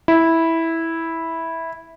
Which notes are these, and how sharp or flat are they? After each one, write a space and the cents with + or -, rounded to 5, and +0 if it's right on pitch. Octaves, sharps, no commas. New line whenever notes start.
E4 -10